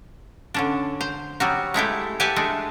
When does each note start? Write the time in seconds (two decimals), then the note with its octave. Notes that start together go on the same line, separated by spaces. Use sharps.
0.54 D3 C#4 D4
1.01 C5
1.40 F#3 G3 F#4
1.74 G#3 A3 E4 G4
2.20 G4 B4 E5 F#5 G#5 A5
2.36 G#3 A3 D4